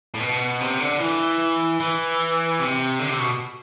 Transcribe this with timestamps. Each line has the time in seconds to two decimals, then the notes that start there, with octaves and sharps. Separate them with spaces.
0.14 A2
0.20 B2
0.61 C3
0.80 D3
0.99 E3
1.80 E3
2.60 C3
2.99 D3
3.09 C3
3.19 B2